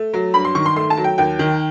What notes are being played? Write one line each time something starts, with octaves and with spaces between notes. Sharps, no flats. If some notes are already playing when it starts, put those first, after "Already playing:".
Already playing: A3
F#3
G2 B5
C6
D#3 C#6
C6
A3 C6
A5
F#3
G5
D#2 G5
D#3